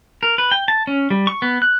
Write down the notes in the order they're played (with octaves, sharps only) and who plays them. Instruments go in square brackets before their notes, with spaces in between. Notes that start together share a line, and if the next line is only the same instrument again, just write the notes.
[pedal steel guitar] A#4
B4
G5
A5
C#4
G3
C#6
B3
F#6